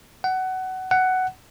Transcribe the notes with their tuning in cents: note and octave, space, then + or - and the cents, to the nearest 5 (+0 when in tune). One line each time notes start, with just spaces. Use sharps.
F#5 +20
F#5 +10